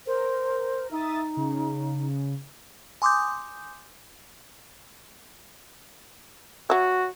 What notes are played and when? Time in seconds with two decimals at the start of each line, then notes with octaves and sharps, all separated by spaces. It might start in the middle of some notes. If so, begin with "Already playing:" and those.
0.07 A#4 C5
0.91 D#4 E5 D#6 A6
1.37 C#3
3.02 G#5 C6 D6 D#6 G6
6.70 F#3 F#4 E5